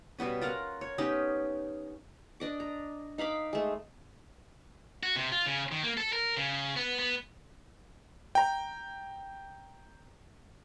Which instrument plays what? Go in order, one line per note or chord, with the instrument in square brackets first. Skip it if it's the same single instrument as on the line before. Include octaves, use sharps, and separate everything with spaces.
[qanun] B2 G3 B3 C#4
F4 A#4 F#5 A#5
C#5
B3 C#4 D#4 G4
D4 D#5 D6
A#5
D#4 F5 B5 D6
G#3 A3
[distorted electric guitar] F#4
C3
F4
C#3
D#3
A#3
A4
A#4
C#3
B3
B3
[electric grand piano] G5 A#5